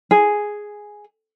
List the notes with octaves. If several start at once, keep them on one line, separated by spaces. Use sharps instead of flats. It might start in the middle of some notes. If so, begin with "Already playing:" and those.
G#4